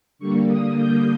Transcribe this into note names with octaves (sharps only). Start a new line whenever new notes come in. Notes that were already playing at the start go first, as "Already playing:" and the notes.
D3 G3 A#3 C#6
D#6
G6